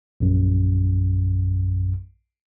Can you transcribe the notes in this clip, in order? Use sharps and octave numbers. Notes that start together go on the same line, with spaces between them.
A#1 F#2